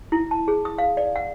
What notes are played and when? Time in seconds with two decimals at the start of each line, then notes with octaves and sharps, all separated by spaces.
0.12 E4
0.31 A5
0.48 G#4
0.65 D#6
0.78 F5
0.97 D5
1.16 F#5